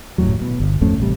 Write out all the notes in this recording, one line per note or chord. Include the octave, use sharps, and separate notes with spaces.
D#1 F#2 A2 F#3
B2
G1
G#1 F2 A3 C#4
A1 C3 G3